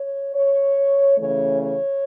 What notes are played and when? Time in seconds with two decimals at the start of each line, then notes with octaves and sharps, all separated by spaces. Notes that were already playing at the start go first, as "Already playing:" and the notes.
Already playing: C#5
0.35 C#5
1.18 C#3 E3 A3 C#4 C#5
1.60 C#5